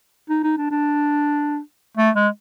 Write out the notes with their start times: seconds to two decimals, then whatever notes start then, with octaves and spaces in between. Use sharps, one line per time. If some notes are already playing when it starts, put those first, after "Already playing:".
0.30 D#4
0.44 D#4
0.57 D4
0.71 D4
1.97 A3
2.15 G#3